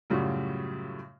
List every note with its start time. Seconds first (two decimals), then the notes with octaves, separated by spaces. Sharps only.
0.10 F#2 A2 C#3 G3 F4 F#4